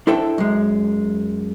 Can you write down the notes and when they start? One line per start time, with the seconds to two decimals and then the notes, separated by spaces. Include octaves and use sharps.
0.07 D4 E4 A4 C5 E5 G5
0.38 F#2 G#3